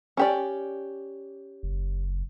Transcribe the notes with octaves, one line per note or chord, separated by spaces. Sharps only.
C#4 G4 D5
F#1